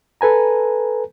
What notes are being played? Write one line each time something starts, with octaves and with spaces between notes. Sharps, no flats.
A4 B4 G#5 A#5